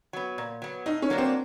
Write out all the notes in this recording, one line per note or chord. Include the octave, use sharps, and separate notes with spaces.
F#3 B3
A#2
F#3 B3
A2 D#4
C#4
F#3 A#3 D4
C4